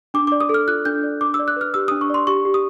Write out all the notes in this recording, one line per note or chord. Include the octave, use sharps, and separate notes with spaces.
D4 D6
D6
D5
D#6
A4
F6
F4 F#6
D4 G6
D5
D4 D6
E6
D5
F#6
B4 F6
G4 E6
D#6
D4
C#6
D5 C6
G4 C#6
G4
D#6